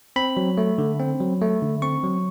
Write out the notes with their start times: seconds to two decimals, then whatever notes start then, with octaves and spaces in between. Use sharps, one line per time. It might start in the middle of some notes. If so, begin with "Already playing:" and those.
0.16 C4 B5
0.37 F#3
0.58 A3
0.78 D3
1.00 C4
1.20 F#3
1.41 A3
1.62 D3
1.82 C4 C#6
2.03 F#3